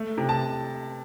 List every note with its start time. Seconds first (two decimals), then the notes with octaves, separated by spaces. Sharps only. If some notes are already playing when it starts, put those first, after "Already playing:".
Already playing: A3
0.18 C3
0.29 A5